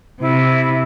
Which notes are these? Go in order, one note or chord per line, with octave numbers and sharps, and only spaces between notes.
C3 E4